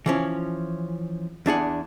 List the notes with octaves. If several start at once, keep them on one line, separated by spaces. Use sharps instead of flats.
E3 F3 C#4
E2 D4 G#4 F#5